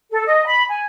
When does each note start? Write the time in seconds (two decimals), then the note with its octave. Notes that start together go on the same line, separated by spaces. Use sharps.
0.10 A4
0.26 D#5
0.45 B5
0.69 G#5